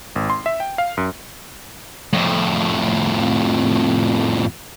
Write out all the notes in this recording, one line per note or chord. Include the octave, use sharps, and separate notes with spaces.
G#1
C6
E5
G5
F5
F#2
F2 A2